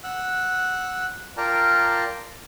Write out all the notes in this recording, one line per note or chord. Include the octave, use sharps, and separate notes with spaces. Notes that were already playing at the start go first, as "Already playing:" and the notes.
F#5 E6 F#6
F4 A#4 D5 G5 A5 A#5